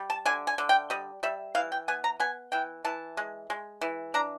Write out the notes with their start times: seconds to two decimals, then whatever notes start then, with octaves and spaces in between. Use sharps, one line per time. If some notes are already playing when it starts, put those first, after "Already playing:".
Already playing: G3
0.10 A5
0.25 D3 G#5
0.47 G#5
0.58 D3
0.69 G5
0.90 G3 D#5
1.23 G3 E5
1.55 E3 F5
1.72 G5
1.88 B3 G#5
2.04 A#5
2.20 B3 G#5
2.52 E3 G5
2.84 E3 A5
3.17 G#3
3.50 G#3
3.81 E3
4.14 D4 A#5